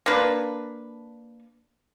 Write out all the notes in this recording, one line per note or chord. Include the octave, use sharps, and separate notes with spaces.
A#3 D4 B4